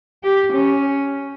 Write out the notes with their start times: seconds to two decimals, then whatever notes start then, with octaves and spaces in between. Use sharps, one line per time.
0.24 G4
0.53 C#4